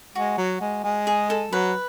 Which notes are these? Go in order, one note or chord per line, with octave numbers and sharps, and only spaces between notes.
G#3 F#4
F#3
G#3
G#3
G#4
A4
F#3 B4